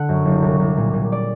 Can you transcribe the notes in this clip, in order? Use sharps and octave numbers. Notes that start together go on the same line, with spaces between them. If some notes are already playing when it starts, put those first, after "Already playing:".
Already playing: D3 F#5
F#2
F#1
C2
C2
A#2
A#2
D5